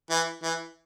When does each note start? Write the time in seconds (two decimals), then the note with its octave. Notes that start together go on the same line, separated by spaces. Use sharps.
0.10 E3
0.43 E3